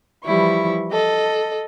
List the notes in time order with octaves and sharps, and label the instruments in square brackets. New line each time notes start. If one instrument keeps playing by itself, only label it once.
[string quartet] E3 F3 G3 E4 C#6
A4 D#5